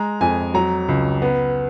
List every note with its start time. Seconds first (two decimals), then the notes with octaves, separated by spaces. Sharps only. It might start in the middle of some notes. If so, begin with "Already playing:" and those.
Already playing: G#3 A#5
0.21 F2 G#5
0.54 F#3 A#5
0.88 C#2
1.22 B3